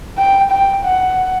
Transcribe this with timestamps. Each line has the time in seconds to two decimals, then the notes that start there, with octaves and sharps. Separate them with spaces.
0.18 G5
0.51 G5
0.85 F#5